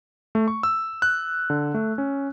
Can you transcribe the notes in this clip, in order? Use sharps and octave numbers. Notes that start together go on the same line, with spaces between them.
A3
C#6
E6
F#6
D3
A3
C#4